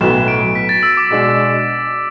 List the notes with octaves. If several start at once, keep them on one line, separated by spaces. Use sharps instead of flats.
B1 A2 F#3 B3 E7
D7
B6
A6
E6
D6
B2 G#3 D4 F#4